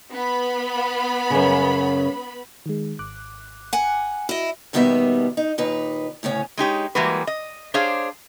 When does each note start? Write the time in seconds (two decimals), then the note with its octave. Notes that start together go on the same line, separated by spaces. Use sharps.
0.12 B3 B5
1.30 F#2 C#3
2.66 D#3 G#3
2.99 G#1 D6 F#6
3.73 F#5 G#5
4.29 E4 F#4 D#5
4.73 D#2 B2 D#3 G3 B3 E5
5.37 D#4
5.58 D#2 A#2 D#4 B4
6.23 D2 A2 C#3 C#4
6.57 G#3 D#4 G4 C#5
6.95 E3 G3 G#3 A#3 F#4 B4
7.27 D#5
7.74 D4 G4 G#4 C5 C#5 F5